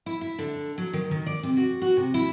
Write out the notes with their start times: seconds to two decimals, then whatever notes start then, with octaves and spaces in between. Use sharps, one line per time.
0.06 E4
0.21 E5
0.39 D3
0.78 F#3
0.93 D#3
1.11 D#3
1.26 D5
1.43 C3
1.57 F#4
1.82 F#4
1.97 C3
2.14 E4